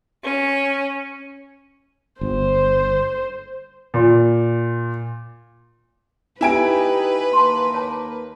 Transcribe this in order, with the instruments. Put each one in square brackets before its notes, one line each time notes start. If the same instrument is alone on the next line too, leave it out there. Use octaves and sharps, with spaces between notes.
[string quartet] C#4
[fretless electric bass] G1 [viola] C5
[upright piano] A#2
[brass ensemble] D#4 G4 [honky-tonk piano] E4 G#5 D7 [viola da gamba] B4
[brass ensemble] D#2 A#3 [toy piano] A5 C6
[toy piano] C#5 A5